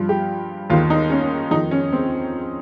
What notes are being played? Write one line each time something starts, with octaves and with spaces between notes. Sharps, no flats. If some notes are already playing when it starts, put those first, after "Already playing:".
Already playing: G2 F3
G4
D#2 D#3 F4
D#4
C#4
F2 D#3 D#4
C#4
C4